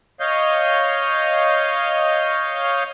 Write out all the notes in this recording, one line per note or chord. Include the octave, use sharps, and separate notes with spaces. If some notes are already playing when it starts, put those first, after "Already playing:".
C#5 D#5 F5 G6